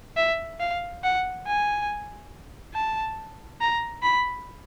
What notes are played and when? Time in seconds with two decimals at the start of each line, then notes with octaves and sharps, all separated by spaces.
0.17 E5
0.60 F5
1.04 F#5
1.47 G#5
2.74 A5
3.61 A#5
4.03 B5